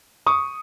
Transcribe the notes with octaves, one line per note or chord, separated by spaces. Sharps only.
C#6 D#6